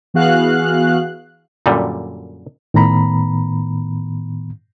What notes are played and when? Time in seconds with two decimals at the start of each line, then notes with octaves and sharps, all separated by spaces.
0.14 E3 B3 F#4 G#4 F5 F#6
1.66 F#2 A#2 D3 G3
2.74 A2 D#3 B3 A#5 B5